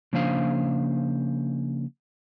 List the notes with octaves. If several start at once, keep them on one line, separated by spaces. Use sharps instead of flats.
C#3 F3 A#3 D4 C5 F5